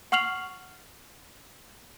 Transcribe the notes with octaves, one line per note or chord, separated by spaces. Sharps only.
F#5 C#6 F6 C7 F7 F#7